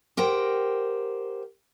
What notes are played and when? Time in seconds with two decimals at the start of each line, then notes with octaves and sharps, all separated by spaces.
0.17 G4 A#4 C5 F#5 G5